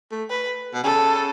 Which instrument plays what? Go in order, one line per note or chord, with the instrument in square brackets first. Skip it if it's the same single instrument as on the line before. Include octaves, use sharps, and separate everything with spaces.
[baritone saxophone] A3
[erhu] B4
[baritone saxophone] B2
[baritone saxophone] C#3 [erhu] A4